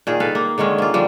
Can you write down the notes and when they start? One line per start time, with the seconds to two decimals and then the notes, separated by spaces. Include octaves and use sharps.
0.07 A#2 D#3 G#4
0.20 A4 B4 F5
0.35 A#3
0.58 D3 D#3 G#3 C#4
0.78 A#3 F4
0.94 D3 F3 G3